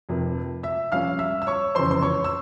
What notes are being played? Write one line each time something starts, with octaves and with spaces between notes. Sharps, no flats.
F1 F2 C3 F3 A#3
E5 E6
A#1 A#2 G3 C#4 F5 F6
E5 E6
E6
C#5 C#6
F1 E2 C#3 C5 C6
C6
C#5 C#6
E6